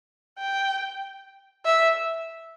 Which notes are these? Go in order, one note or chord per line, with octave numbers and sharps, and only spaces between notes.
G5
E5